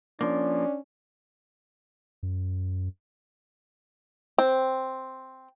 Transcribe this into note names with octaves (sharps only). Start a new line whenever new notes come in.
F3 A#3 C#4 D4
F#2
C4